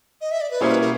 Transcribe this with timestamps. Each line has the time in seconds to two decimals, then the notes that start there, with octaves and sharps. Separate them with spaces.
0.21 D#5
0.31 E5
0.41 D5
0.50 B4
0.61 B2 G3 A#3 C#4 E4 C5
0.71 B4
0.81 A#4